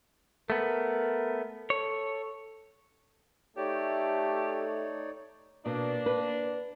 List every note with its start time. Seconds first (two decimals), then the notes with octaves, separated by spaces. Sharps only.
0.50 A3 B3 A#4
1.70 A4 C#5
3.57 A3 D#4 G4 C#5 D5
5.66 B2 A#3 D4
6.06 B4